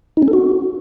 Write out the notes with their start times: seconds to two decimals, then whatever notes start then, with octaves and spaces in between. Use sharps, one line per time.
0.17 D#4
0.22 C#4
0.28 A4
0.33 F#4